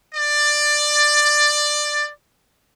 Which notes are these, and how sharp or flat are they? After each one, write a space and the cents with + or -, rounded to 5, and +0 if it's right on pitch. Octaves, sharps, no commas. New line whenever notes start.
D5 +15